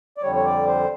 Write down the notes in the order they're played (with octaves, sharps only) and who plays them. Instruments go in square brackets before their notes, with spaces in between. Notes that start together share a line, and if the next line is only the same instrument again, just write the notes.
[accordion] D5
F2 D3 G3 C#5
C#5
D5
C5